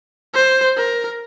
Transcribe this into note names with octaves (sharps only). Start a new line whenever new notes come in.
C5
A#4